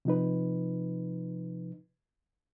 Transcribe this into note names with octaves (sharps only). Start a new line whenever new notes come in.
C3 F3 D#4 B4